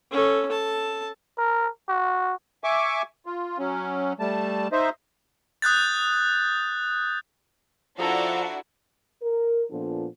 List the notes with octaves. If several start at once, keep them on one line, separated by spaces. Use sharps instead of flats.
C#4 A4
A4 A5
A#4
F#4
E5 G#5 C#6 D6
F4
F#3 C#4
G3 A3 A5
D#4 C5 D#5 E5
D#6 F#6 G6 A6
F3 D4 E4 F#4 A4 F#5 A#5
A#4
A#2 F3 B3 D4 F4 A4